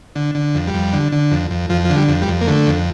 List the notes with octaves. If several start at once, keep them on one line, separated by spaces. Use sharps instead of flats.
D3
D3
F2
G3
F2
D3
D3
F2
F2
F2 F3
D3 F3
G3
F2
G3
F2
A#3
D3 A3
F2